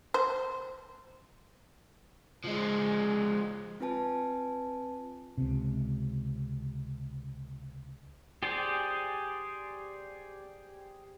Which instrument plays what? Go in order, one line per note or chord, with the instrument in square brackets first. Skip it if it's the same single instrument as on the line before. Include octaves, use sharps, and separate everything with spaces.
[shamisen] C5
[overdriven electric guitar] F3 G#3
[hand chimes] C4 F4 B4 G#5 A5
[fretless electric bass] C#2 C3
[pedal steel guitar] G4 G#4 C5 D5